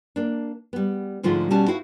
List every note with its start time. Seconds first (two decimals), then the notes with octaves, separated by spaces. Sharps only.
0.16 A#3 D4
0.73 G3 B3
1.23 G#2 D3 F3 G#3 A3 F4
1.50 B2 G3 C#4 F#4 A5
1.68 E4 F#4 C5 F5